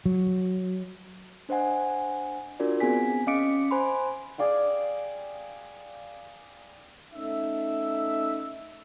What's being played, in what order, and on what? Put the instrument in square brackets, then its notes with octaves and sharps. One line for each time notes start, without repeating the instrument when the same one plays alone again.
[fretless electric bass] F#3
[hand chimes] D4 C5 D#5 F#5 G#5
D4 F4 F#4 A#4 D5
B3 C4 G#4 G#5 B6
C#4 D#5 F5 D6 C#7 D7
C5 G#5 B5 C6
[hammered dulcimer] G#4 D5 F5 G5
[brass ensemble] A3 C#4 D#4 E5